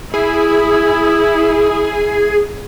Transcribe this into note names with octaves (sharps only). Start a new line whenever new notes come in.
E4 G#4